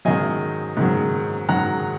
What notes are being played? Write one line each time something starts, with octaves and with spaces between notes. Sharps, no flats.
G#2 D#3 F#3 D#5 G#5
G#2 D#3 F#3
G#2 D#3 F#3 F#5 A#5